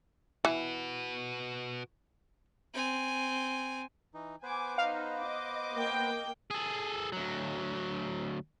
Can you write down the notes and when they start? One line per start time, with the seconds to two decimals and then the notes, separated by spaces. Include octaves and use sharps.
0.45 E3 F#4 B4
2.74 C4 G#5
4.14 E3 D#4
4.43 B3 B4 C5 G#5 D6
4.78 D#4 F5
5.19 D#5 D6
5.73 A#3 G5
6.51 G#4 A4
7.12 D2 F#3